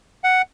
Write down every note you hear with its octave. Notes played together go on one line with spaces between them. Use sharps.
F#5